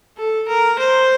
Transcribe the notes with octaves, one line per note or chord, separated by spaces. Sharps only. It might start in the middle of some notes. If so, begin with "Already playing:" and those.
A4
A#4
C5